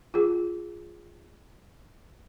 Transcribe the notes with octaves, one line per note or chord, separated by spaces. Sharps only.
F4 G#4